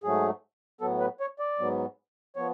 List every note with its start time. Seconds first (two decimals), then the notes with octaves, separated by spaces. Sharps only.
0.04 G#2 F#3 A3 G#4
0.81 A2 F#3 B3 A4
1.00 B4
1.20 C#5
1.39 D5
1.59 G#2 F#3 B3
2.36 F3 B3 C#5